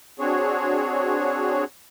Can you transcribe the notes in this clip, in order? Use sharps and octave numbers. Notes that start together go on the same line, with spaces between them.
C4 D4 F#4 G#4 C#5